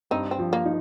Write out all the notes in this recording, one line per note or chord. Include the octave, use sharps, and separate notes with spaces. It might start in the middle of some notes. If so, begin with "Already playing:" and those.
G2 C4 D#4
C4
F3
A#3
D#4